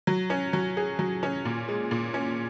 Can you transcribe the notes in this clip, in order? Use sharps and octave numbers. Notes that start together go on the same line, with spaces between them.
F#3
C#4
F#3
G#4
F#3
C#4
A#2
G#3
A#2
C#4